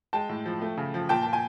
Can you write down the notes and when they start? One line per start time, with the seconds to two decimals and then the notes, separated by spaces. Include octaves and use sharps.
0.13 G#3 G5 A5
0.29 A2
0.45 F3
0.62 A3
0.78 C#3
0.94 F3
1.09 A#2 G5 A5
1.22 A#2 A5
1.33 G#5